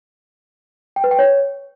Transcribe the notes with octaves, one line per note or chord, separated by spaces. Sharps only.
G5
B4
G5
C#5